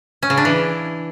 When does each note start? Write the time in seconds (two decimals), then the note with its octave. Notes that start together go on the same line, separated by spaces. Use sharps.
0.23 C#4
0.30 C#3
0.37 D4
0.45 E3